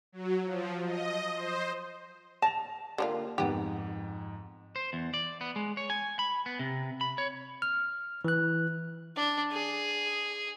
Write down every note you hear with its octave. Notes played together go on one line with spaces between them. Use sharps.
F#3
F3
D#5
C5
A5 A#6 F7
D3 A#3 D4 F4 G4
F2 G#2 B3 G4
C5
E2
D5
B3
G#3
C#5
G#5
B5
B3
C3
B5
C#5
F6
E3 F#6
D4
G#4